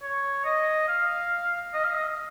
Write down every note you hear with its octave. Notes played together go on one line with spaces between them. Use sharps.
C#5
D#5
F5
D#5
F5
D#5